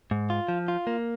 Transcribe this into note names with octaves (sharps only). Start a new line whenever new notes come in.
G#2
F4
F3
F4
A#3